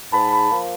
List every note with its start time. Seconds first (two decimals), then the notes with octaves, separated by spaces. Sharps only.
0.12 G#2 A5 B5
0.51 F3 A#3